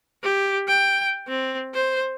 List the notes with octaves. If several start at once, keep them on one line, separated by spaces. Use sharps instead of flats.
G4
G5
C4
C5